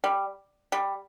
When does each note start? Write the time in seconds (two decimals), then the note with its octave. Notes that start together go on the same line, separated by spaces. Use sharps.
0.04 G3
0.72 G3